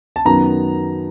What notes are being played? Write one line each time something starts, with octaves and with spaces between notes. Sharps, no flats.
A5
F#2 D#3 F#3 B3 A#5